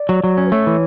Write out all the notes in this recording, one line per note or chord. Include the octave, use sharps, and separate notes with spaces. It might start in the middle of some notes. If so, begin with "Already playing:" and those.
Already playing: D5
F#3
F#3
C#4
B4
A3 C#5
E3